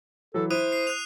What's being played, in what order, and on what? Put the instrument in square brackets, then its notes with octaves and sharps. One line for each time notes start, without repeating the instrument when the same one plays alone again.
[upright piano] E3 F#3 [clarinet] A4
[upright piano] E4 [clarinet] C5 [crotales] D#6 F#6 D#7
[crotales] C7
F#6 F7